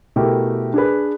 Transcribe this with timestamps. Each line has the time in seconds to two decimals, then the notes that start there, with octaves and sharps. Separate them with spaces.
0.16 B2 A3 E4 G4 A#4
0.74 D4 G#4 B4